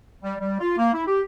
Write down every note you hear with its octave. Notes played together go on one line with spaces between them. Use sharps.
G3
G3
F4
A#3
E4
G4